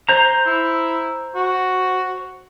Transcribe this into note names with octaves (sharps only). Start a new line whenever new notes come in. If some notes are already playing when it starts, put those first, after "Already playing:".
C5 A#5
E4
F#4